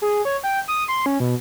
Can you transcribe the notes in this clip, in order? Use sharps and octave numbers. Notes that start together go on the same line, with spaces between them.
G#4
C#5
G5
D#6
C6
C#4
B2